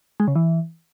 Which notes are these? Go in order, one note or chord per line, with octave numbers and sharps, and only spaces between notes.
G#3
C#3
E3